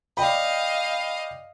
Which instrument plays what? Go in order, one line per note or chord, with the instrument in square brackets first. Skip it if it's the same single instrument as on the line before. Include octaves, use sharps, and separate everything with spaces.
[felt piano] D5 G5 B5 [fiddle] D#5 F5